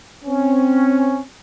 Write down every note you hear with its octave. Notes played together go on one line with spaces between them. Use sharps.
C4 C#4